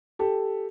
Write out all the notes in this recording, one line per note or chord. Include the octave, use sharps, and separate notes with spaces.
G4 A4